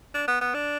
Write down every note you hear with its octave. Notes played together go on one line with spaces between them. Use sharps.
D4
B3
B3
D4